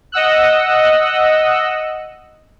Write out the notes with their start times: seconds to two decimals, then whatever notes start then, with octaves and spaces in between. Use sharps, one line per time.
0.12 D#5 F#5 E6 F#6